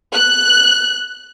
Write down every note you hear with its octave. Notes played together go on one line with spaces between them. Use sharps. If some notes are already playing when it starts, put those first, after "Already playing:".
F#6